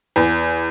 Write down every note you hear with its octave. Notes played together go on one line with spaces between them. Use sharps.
E2